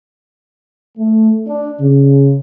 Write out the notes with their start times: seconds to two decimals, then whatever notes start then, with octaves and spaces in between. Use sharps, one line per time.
0.98 A3
1.47 D4
1.80 C#3